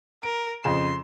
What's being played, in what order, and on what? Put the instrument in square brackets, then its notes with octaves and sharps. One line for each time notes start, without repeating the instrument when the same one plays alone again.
[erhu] A#4 [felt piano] D7
[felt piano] F2 C#3 E7 [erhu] C6